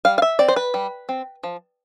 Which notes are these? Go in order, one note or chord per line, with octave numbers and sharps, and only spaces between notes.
G3 F5
F5
E5
C4 D5
C5
B4
G3
C4
F3